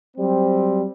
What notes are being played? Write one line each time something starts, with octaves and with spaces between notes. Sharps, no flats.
F#3 G3 C4